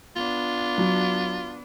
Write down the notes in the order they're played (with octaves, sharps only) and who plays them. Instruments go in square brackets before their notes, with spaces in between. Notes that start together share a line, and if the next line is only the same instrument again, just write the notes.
[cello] B3 D4 [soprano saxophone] F4
[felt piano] F#3